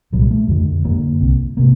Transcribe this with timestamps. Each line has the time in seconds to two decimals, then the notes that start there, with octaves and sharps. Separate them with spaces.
0.13 C2 A#2 F#3
0.22 G3
0.31 A3
0.48 F2 D3
0.84 F#2 D3 A#3
1.20 C2 C3
1.57 C3 A#3